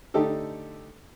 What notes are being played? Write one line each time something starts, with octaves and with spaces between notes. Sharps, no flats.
D3 A3 D#4 G4 A4